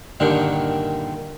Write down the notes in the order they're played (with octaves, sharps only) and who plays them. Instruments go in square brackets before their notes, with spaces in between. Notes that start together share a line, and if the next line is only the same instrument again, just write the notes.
[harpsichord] G2 A#2 D3 D#3